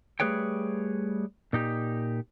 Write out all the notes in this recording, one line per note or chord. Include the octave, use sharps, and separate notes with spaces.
G3 A3 G#4 B4 C#5 G5
A#2 D#4 G4